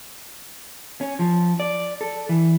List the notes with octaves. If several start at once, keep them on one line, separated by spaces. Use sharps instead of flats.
C#4
F3
D5
A4
E3